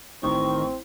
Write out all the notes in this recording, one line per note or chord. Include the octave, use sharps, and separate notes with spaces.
A1 D#3 C4 C#6